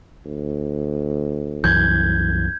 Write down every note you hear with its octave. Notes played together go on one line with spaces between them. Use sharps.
D2
C2 F#2 E3 G6 G#6